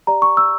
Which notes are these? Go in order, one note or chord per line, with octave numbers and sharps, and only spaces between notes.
G4 D5 A#5
C#6
E6